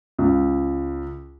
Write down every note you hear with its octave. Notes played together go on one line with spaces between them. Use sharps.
C#2